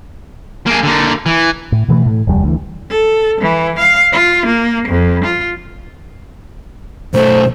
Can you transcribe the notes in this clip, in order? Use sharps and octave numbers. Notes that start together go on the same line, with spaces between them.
A#3 G#4
D3 A#3
E3
A2
B2 E3 G#3 A3
A2
F1 D#2 G3
D2 E3
A4
E3
F5
F4
A#3
F2
F4
B1 A3 C5